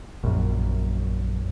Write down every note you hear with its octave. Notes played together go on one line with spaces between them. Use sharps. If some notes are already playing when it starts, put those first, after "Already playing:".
A#1 F#2